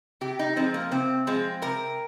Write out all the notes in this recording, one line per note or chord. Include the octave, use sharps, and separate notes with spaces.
C3 G4
D#4
F3 G#3 C4
A#3
C3 C4
F3 G#3 C4
C3 A#4